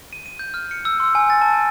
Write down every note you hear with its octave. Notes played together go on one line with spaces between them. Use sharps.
D#7
D#7
G6
F6
C#7
E6
C6
G#5
A6
A5
G#5